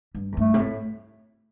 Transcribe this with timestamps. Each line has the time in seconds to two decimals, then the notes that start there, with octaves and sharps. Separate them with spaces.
0.15 G2
0.32 E2
0.37 G2 A3
0.54 C3
0.60 A2